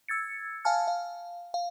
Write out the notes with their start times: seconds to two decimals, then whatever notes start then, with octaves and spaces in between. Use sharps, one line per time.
0.08 E6 G#6 A6 C#7
0.65 F5 G#5 A5 F6
0.88 F5
1.54 F5